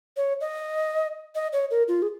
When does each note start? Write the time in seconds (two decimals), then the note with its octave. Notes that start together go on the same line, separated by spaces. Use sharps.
0.17 C#5
0.41 D#5
1.35 D#5
1.53 C#5
1.71 A#4
1.88 F4
2.02 G#4